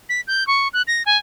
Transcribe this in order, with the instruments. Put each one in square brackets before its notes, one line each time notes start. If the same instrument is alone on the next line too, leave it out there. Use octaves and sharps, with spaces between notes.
[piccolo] B6
G6
C#6
F#6
A#6
G#5